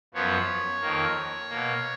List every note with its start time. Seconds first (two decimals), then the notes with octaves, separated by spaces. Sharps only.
0.14 F#2 F3 B3 C#5
0.81 F2 D#3 A#3
1.49 B2 A#3